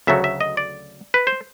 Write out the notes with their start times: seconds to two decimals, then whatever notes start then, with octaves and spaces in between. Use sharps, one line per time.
0.07 D2 C#3 F#3 A3 E5
0.24 E5
0.41 D#5
0.57 D5
1.14 B4
1.27 C5